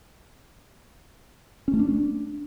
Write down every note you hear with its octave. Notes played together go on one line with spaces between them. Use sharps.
C#4
A3
D4